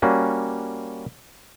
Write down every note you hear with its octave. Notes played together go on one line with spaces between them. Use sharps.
G3 A#3 C#4 F#4